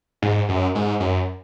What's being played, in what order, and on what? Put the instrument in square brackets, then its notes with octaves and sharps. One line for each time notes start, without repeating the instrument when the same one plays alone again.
[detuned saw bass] G#2
F#2
G#2
F#2